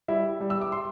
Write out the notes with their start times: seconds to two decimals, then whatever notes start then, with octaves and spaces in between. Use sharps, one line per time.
0.08 G3 E4 E5
0.40 G3
0.50 E6
0.61 D6
0.72 C6